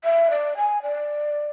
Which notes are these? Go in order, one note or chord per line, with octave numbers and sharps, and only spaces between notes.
E5
D5
G#5
D5